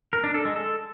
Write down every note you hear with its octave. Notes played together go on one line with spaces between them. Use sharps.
A#4
D4
A4
G#3
A4